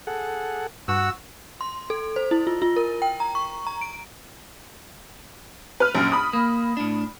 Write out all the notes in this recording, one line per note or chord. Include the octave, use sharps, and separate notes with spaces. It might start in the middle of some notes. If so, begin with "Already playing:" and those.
G#4 A4 F#5
G2 F#4 F#5 E6
C6
A4
C5
E4
F4
F4
A#4
G5
A#5
C#6
A#5
D7
B4 F6
A#1 F#2
B5 D#6
A#3
A2 D4